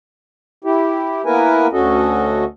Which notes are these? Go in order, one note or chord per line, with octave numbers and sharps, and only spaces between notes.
E4 G4
A#3 B3 E4 A#4 B4 G#5
D2 C#4 F#4 A4 D#5